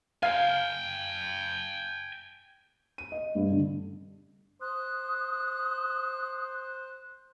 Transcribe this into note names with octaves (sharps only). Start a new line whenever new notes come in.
F5 G5 G#5
D#7
D#5
G2
D3
C5 D#6 F#6